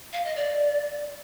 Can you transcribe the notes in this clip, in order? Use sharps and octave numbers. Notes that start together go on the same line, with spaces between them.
F5
D#5
D5